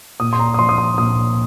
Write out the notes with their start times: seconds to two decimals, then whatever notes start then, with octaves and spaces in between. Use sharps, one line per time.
0.20 A#2 D#6
0.33 C6
0.39 A#5
0.54 D#6
0.59 F3 C6
0.69 D#6
0.78 C6
0.98 A#2 D#6